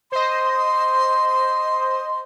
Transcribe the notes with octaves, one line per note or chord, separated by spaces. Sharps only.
C5 D#5 C6